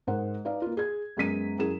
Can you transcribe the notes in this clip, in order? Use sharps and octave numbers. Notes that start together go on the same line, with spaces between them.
G#2 G#3 A#4 C5 F#5
D#4 B4 D5 F5
A#3 F4
G#4 G#6
F#2 G#3 B3 B6 D#7
F#2 E4 G#4 E7